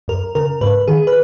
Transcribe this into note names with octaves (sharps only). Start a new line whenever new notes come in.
F#2 A#4
C#3 A#4
G#2 B4
D#3 G#4
B4